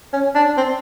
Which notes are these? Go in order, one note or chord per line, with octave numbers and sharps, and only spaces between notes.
C#4
D4
C4